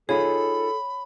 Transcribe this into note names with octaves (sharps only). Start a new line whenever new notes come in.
D#4 F4 G#4 A4 C#5 B5